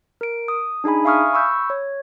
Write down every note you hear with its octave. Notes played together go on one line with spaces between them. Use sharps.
A#4 D7
D#6
D4 D#4 G#4 G#5 B5
E5 F5 G#5 C#6 D#6 F6
B5 C#6 E6 G6
C#5